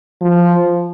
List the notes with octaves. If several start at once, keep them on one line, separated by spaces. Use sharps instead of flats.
F3